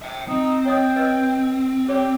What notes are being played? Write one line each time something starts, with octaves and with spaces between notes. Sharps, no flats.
E5 G5
C4 D#4
C#5 D#5 G5 D#6
B4 D#5 E6
G4 C#5 D5